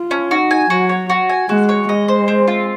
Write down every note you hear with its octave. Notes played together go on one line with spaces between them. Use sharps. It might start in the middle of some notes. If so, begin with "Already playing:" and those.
Already playing: F4
C#4
D#4 F#4
G#5
F#3 F#4
C#5
F#4
G#5
G#3 F#4
C#5
G#3 D#5
C5
C4
F4